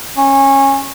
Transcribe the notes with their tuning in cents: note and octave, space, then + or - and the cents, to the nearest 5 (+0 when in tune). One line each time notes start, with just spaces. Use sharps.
C#4 -20